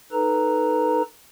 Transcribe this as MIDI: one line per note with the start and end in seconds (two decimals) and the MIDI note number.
0.12 1.02 63
0.12 1.02 69
0.12 1.02 71
0.12 1.02 82